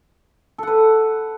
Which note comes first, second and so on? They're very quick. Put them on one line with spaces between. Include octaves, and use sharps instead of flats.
A4 F#5 B4